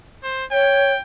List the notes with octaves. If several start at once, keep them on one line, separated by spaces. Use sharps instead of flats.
C5
C#5 G5